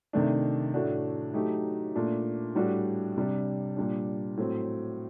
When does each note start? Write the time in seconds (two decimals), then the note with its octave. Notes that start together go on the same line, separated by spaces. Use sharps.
0.13 C3 D#3 A3 D4
0.74 A2 A3 D4 F#4
1.34 F#3 A3 D#4 G4
1.95 A#2 A3 D4
2.55 A2 G3 D4 F#4
3.17 C3 G3 D4
3.76 A#2 G3 D4
4.37 A2 F#3 C4